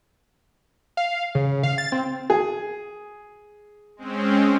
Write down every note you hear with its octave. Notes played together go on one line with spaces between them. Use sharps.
F5
C#3
F5
A6
C4
G#4
G#3 C4 C#4